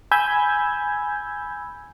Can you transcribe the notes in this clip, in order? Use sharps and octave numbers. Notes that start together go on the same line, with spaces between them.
G#5 B5 E6 G6 G#6